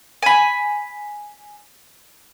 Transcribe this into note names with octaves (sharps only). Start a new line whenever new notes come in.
G#5 B5